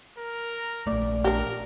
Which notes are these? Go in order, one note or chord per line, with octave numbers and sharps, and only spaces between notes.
A#4
A#1 A3 D5
D4 G4 A#4